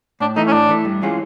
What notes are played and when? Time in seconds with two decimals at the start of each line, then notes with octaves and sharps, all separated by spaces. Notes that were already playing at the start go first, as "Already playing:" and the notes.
0.20 A2 D4
0.36 E3 A3 D#4
0.48 C#4
0.53 A2 D4
0.69 E3 A3
0.85 G2
1.02 E3 G#3 C#4 F4